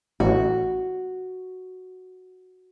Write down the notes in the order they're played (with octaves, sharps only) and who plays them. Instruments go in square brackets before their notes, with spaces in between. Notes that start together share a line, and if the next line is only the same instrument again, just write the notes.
[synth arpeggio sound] A1 [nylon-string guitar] F#4